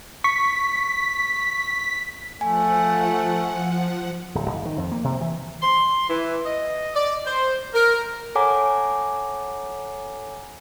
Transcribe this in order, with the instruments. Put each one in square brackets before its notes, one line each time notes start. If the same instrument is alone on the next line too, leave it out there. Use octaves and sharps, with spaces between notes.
[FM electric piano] C#6 [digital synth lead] B6
[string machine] F3 F#5 [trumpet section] A3 [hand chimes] G#5
[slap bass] D1
F#1
D#3
F2
A#3
C3
E3
[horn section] C6
E3
D#5
D5
C5
A#4
[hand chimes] A4 C#5 F#5 G#5 A#5 D6